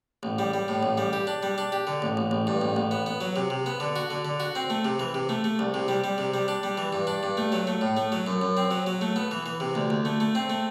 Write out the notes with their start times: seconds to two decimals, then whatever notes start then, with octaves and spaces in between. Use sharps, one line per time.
0.23 A1
0.39 G3
0.54 G3
0.68 A2
0.83 A1
0.98 G3
1.13 G4
1.27 D4
1.43 G3
1.58 D4
1.72 G4
1.87 D3
2.02 A1
2.17 A1
2.31 A1
2.47 G2
2.61 A1
2.76 A1
2.91 B3
3.06 B3
3.21 F#3
3.36 C3
3.50 C3
3.66 B3
3.80 D3
3.96 F#4
4.10 D3
4.25 D3
4.40 F#4
4.55 C4
4.70 A3
4.85 C3
5.00 E3
5.14 C3
5.29 A3
5.44 A3
5.59 C2
5.74 C3
5.88 G3
6.04 G3
6.18 C3
6.34 G3
6.48 D4
6.63 G3
6.77 E3
6.93 G2
7.07 D4
7.23 G2
7.37 A3
7.52 F#3
7.67 A3
7.81 A2
7.97 A3
8.12 F#3
8.27 F#2
8.41 F#2
8.57 C4
8.71 F#3
8.86 F#3
9.01 A3
9.16 B3
9.31 E3
9.46 E3
9.60 C3
9.75 D2
9.90 D2
10.05 A3
10.20 A3
10.35 C4
10.50 A3